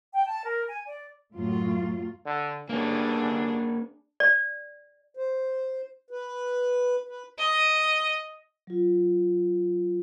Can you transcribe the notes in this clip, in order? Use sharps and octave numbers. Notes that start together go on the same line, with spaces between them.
G5
A5
A#4
G#5
D5
F#2 A2 F#3 F4
D3
G1 A#3 C#4 D4 G#4
D5
C5
B4
B4
D#5
F#3 F4